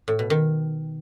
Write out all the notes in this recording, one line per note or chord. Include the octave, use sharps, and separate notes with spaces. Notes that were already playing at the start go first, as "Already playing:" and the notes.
A2
B2
D#3